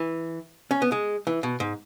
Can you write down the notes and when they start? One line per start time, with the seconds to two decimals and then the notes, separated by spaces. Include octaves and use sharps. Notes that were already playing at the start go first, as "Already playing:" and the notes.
Already playing: E3
0.71 C#4
0.82 B3
0.92 G#3
1.27 E3
1.43 B2
1.60 G#2